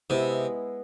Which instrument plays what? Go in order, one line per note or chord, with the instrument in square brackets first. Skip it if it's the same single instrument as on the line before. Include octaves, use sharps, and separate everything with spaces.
[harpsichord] C3 [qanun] G#3 B3 E4